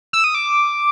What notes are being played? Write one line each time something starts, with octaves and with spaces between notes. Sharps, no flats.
E6
D#6
D6